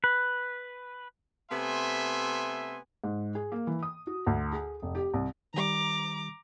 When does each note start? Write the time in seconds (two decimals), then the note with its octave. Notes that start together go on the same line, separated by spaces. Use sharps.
0.04 B4
1.51 C3 A3 B3 E5 G#5 C6
3.04 G#2
3.35 G#4
3.52 A#3
3.67 E3
3.83 D#6
4.07 F#4
4.27 D2
4.53 G#4
4.82 F1
4.95 G4
5.14 C2
5.54 D#3 G3 A#5 D6